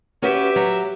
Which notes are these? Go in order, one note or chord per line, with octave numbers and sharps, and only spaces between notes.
C#4 F#4 G4 B4 E5
F#3